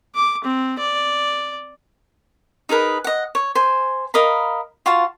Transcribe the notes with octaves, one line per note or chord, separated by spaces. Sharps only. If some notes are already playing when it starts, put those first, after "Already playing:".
D6
C4
D5
D#4 G#4 A#4 B4
D#5 F#5
C#5
C5 G#5
A#4 D#5 F5 B5
F4 F#4 F5 A5